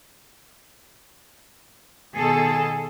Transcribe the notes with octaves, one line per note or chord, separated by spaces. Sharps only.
B2 D#3 G#4 A4